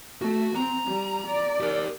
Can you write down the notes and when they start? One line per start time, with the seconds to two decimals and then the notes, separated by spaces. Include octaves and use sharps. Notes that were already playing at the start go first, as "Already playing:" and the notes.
0.22 A3 F#4
0.55 C4 A#5
0.87 G3
1.27 D5
1.60 G4 A#4